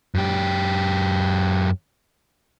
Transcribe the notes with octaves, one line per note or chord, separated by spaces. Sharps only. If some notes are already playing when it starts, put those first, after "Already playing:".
F#2 G4